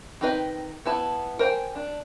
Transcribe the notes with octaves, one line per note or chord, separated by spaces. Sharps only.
D#3 C4 D#4 B4 D#5
B3 E4 A5
A#4 C5 G5 G#5
D4